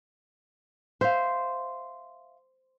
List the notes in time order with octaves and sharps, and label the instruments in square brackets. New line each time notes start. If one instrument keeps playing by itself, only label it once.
[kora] C5 [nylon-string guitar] E5 F5